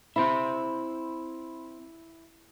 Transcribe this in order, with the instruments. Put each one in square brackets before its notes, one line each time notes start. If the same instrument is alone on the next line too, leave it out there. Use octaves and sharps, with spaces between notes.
[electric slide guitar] C4 C5 E5 [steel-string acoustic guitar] E4 [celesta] B5